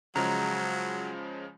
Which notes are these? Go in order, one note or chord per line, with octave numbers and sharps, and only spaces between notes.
C#3 F3 F#3 G#3 A#5